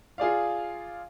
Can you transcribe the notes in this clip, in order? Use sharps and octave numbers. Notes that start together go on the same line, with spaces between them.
F4 G#4 D5 F5